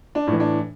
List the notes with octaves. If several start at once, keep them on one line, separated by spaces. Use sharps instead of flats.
D4
A2 E3
D4